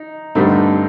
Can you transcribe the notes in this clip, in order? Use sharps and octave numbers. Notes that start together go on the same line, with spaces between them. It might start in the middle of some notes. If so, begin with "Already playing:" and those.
Already playing: D#4
G2 D3 A3 C4 D#4